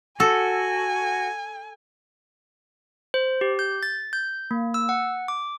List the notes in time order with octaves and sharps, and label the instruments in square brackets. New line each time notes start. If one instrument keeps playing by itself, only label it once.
[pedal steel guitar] F#4 [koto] A4 [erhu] G#5
[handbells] C5
G4
G6
A6
G6
A#3
E6
F#5
D6